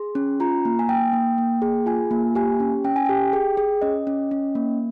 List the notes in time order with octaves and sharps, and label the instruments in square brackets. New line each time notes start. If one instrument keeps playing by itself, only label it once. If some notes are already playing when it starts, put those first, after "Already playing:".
Already playing: [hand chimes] G#4 C6
C#4
F4 A#5
A#3
G#5
A#3 G5
A#3
A#3
G#4
F4 G#5
A#3
G4 G#5
C#4
C#4 G5
G#5
G4 G5
G#4
G#4
C#4 D#5
C#4
C#4
A#3